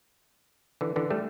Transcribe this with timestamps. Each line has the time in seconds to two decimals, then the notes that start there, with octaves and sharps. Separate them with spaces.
0.81 D3 E3
0.96 D3 E3
1.10 G3 A3